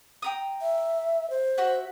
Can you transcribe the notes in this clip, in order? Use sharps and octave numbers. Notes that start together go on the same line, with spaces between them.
G5 A#5 D#6
E5
C5
F#4 E5 F#5